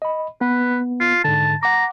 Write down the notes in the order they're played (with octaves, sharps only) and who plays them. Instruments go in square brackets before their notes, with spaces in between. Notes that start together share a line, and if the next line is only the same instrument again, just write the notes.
[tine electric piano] D#5 B5
[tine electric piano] B3 [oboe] B4
[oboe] F4
[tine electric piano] G#2 D3 [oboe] A5
[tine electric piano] F#5 D6 [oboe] A#5